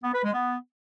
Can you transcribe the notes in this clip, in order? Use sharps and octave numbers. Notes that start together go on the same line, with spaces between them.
B3
B4
G#3
B3